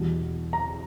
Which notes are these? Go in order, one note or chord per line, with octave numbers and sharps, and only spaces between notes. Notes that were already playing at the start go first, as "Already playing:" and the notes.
Already playing: E2 B2 G3
A#5